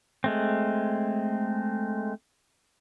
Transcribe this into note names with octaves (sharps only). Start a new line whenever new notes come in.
G#3 A3 C4